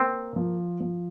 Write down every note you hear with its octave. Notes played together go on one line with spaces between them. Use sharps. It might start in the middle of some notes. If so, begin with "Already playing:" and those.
Already playing: A#3 C4
F3
F3